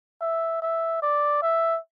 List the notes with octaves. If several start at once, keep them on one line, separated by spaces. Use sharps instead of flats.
E5
E5
D5
E5